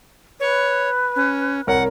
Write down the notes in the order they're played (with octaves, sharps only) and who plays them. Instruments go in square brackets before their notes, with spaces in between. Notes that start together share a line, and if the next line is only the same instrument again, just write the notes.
[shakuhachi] B4 [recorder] C#5
[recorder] C#4
[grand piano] C2 A#4 C#5 [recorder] F#5